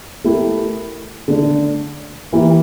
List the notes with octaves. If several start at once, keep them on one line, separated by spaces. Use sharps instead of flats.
A3 E4 G4 A#4
D3 A3 D4
E3 A#3 E4 G4 A#4